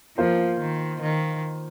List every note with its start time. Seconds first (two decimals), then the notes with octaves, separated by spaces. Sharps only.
0.18 F3 A#3 F4 C5
0.60 D#3
1.01 D#3